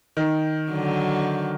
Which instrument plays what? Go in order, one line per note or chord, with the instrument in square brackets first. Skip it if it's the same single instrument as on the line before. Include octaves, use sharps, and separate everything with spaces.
[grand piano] D#3
[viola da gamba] D3 F#3